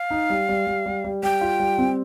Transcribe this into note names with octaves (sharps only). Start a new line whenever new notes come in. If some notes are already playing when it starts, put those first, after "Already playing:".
Already playing: F5
D#4
G3
G3
G3
G3
G3
G3 G5
F4
G3
C4